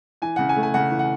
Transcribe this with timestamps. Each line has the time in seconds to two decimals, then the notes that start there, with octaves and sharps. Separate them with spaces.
0.22 E3 G#5
0.36 C#3 F#5
0.49 G#5
0.56 A3
0.63 G#5
0.74 C#3 F#5
0.91 E3
0.99 F#5